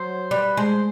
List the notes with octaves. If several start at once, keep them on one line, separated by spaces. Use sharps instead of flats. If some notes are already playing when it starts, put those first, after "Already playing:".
Already playing: F#3 C5
G3 B4
G#3 C5